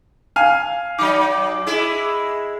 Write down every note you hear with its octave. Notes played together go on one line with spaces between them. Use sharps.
F5 G#5 F6
F#3 D#4 D6
G#3 E4